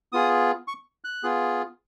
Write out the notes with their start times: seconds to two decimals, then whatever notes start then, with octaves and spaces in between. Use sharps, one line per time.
0.12 B3 F4 G#4 D#6
0.68 C#6
1.04 F#6
1.23 B3 F4 G#4